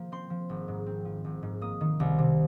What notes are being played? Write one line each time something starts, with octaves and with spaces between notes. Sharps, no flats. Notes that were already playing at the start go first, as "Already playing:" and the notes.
Already playing: F3 A#3
C4 C6
F3
G#1
G#2
C4
F3
G#1
G#2
A#3 D#6
D#3
C2
C3